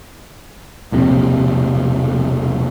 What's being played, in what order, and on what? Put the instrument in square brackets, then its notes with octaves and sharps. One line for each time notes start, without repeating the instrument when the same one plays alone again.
[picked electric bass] E1 A#1 C3